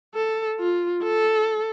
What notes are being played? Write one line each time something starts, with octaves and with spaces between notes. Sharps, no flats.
A4
F4
A4